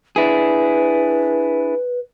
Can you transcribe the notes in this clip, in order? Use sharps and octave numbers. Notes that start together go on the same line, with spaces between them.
D4 E4 G#4 B4